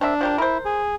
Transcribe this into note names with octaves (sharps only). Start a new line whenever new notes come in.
C4 D4 A#4 E5
F3 G4 A#4
E4 A#4 C5
G#4